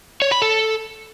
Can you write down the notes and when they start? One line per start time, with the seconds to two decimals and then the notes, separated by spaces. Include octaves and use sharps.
0.22 C#5
0.32 B5
0.42 A4